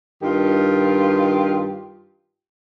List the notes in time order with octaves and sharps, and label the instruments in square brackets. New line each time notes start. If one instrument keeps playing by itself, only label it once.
[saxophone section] G2 D#3 F4 G4